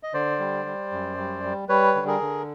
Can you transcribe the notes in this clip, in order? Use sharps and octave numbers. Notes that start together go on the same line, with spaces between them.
D#5
D3 C5 D5
G3
G3
F#2
G3
G3
G3 B4 C#5
D3
G#4 A#4
D3